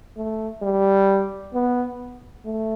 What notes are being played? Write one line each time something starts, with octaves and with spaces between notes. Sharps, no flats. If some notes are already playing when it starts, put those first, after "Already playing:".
A3
G3
B3
A3